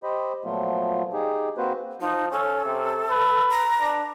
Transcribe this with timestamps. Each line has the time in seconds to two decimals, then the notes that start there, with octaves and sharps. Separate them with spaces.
0.03 G4 C5 D#5 B5
0.45 A#2 F3 F#3 A3 B3 F4
1.13 D#4 G4 G#4
1.57 A#3 C4 F#4 B4 C5
2.01 F3 D#4
2.32 C#4 A4
2.65 C3
3.11 B4
3.50 A#5
3.81 D4